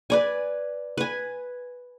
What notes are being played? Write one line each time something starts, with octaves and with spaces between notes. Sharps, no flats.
B4 D5 G#5
B4 G#5